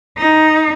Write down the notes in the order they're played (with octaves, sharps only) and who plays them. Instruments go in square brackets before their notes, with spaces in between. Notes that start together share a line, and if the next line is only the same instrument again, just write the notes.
[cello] D#4